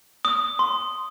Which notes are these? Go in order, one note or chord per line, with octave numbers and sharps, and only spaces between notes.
D#6
C6